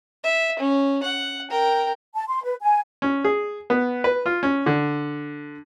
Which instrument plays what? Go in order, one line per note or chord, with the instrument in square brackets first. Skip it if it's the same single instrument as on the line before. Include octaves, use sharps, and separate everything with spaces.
[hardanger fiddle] E5
C#4
F#5
A#4 G5
[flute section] A5
C6
B4
G#5
[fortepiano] C#4
G#4
B3
B4
F4
C#4
D3